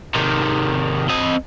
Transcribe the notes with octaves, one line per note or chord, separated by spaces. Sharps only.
C3 D#3
C4 D#5